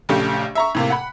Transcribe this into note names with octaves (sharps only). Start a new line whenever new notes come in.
A#1 C#3 A3 G4
E5 A#5 C#6
A2 C3 A#3
F#5 B5